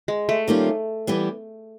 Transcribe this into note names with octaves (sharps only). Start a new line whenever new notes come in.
G#3
A3
D#3 G3 A#3 C#4 F4
E3 G3 B3